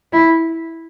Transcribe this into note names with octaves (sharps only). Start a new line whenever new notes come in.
E4